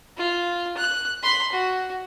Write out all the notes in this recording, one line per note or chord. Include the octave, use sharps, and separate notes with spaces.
F4
F#6
B5 C6
F#4